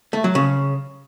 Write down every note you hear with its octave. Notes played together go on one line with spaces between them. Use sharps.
A3
F#3
C#3